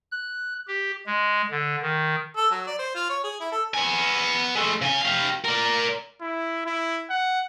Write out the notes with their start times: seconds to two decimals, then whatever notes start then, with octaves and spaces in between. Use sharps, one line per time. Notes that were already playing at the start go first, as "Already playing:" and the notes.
0.12 F#6
0.68 G4
1.06 G#3
1.51 D3
1.82 D#3
2.37 A4
2.51 F#3
2.67 D5
2.79 C5
2.95 F4
3.09 C#5
3.24 G#4
3.40 E4
3.52 A4
3.74 B3 G#5
4.55 G#3 A3
4.82 C#3 G#5
5.01 G4 F5
5.45 A#4 D5
6.21 E4
6.66 E4
7.10 F#5